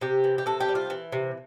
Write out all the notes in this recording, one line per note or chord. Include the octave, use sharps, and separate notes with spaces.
C3 G4
E3
G4
C3 A4
G4
G3
F4
E3
C3